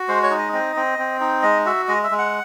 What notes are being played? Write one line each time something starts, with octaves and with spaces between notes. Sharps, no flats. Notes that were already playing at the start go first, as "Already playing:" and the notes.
Already playing: F#4
G#3 C5
C#5
D#4
D#5
C4 D#5
C4
C4
D#4
G#3 D#5
F#4 E5
G#3 D#5
E5
G#3
F#5